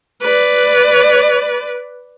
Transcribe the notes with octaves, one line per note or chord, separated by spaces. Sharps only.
B4 D5